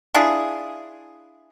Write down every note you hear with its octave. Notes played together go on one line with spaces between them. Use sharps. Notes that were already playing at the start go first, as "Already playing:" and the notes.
D4 E4 F4 G#4